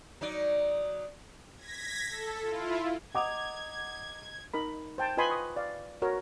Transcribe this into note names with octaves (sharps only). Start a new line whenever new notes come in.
F#3 D#4 D5
G#6 A#6 B6
A4
E4 F4
D#5 F#5 A#5 D6 D#6 G#6 F7
D#4 A#4 B5
C5 G5 A5 C6
F4 B4 D#5 G#5 B5 C6
C#6 D#6
D5 F5
F#4 A#4 C#5